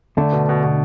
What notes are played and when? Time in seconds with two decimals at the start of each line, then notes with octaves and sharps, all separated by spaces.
0.17 D3 A3 D4
0.32 B2
0.49 B2
0.63 B2